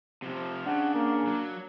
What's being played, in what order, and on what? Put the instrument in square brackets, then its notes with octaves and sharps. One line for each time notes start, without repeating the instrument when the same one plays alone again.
[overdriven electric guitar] C3 F3
[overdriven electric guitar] C#3 [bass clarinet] D4 [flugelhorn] F#5
[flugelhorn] A#3
[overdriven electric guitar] F#3